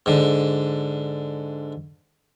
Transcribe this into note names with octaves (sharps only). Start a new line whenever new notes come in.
G#2 D3